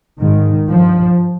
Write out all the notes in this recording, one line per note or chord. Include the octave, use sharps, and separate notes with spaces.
G#2 D#3
G2 F3